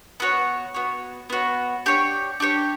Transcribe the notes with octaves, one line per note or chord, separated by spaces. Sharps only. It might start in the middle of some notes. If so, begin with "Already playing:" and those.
B3 F#4 C#5
B3 F#4 C#5
B3 F#4 C#5
D4 G4 C#5
D4 G4 C#5